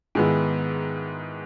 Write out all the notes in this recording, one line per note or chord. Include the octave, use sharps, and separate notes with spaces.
G#2 D#3 G#3 B3 E4